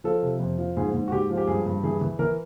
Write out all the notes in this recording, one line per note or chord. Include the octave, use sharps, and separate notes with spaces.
F3 A4
C3
F2
F3
G#2 G#4
G#2
F#4
G#2 G4
F3
G4
G2 G#4
G2
E3 G#4
E3
E3 A#4